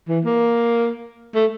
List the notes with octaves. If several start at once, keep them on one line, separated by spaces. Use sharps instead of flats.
E3
A#3
A3